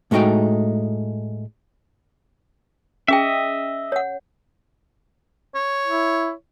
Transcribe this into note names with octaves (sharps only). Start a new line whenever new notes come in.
A2 G#3 A3 D#4 F#4 G5
C#4 G#4 D#5 E5 G5
C#5 F#5
C#5
E4